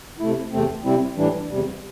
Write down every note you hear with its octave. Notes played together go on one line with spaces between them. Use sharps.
C3 A3 E4
E2 C3 A3 C4
C3 G3 C4 E4
A2 E3 G3 D4
E2 C3 G3